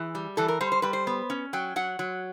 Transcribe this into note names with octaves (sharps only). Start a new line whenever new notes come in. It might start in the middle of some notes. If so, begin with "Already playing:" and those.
Already playing: E3 G#4
G3
E3 A4
A#4
G3 C5
C5
G3 B4
C5
B3
C#4
F#3 G5
F#3 F#5
F#3